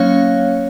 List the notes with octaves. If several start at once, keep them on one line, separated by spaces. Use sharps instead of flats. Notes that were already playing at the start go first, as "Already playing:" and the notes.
Already playing: F#3 A#3 C#4 C#5 F5